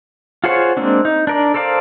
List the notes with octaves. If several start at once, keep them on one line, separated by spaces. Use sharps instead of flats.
F4 F#4 G#4 C5 C#5
G#3 A#3 C4 D4
D#4
D4 A#4 D5
A4 A#4 C5 D5 F5